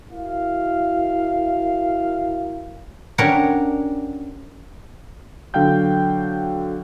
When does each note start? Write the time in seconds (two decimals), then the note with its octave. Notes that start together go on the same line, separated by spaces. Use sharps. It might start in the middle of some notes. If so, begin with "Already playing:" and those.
0.10 E4 F#4 A#4 F5
3.18 C#4 D4 G4 A#4 C#5 F#5
5.54 D3 F#3 F5 G5 G6